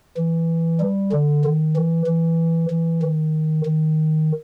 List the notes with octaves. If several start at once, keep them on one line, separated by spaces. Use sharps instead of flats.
E3
G3
D3
D#3
E3
E3
E3
D#3
D#3